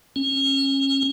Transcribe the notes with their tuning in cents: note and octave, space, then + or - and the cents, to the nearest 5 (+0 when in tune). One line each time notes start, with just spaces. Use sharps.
C#4 -30